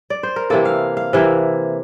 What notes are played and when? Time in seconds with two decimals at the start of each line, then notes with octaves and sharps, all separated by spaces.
0.10 D5
0.23 C5
0.36 A#4
0.50 C3 E3 A#3 A4
0.65 F5
0.97 F5
1.13 C3 E3 A#3